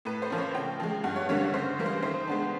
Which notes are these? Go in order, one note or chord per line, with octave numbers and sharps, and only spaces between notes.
A2 B4
C5
F3 A#3 C#4
C#5
C#3 G5
F3 G#3
G2 F#5
C#5
D3 G3 A#3 C#4 C#5
C#5
C#3 C5
E3 G3 A#3
C5
D#3 C5
G#3 B3 D4